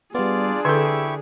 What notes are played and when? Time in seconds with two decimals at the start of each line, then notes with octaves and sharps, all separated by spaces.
0.15 G3 B3 D4 F4 G#4 D5
0.65 D3 E4 G4 A4 C#6 E6